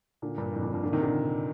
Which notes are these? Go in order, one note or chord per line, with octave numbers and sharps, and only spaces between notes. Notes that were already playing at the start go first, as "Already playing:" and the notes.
A#2 D3
G2 A#2
F2 A2
G2 A#2
G2 A#2
A#2 D3
C3 D#3
A#2 D3